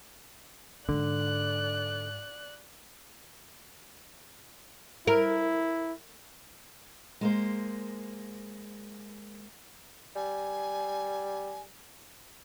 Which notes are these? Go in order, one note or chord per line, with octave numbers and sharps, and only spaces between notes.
G#2 D3 D5 F#6
E4 A#4
G#3 A#3 C5
G3 G#5